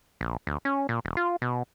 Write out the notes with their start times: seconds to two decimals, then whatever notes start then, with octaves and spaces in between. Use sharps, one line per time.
0.21 A#1
0.47 D2
0.65 C#4
0.89 A#2
1.05 E1
1.17 F4
1.42 B2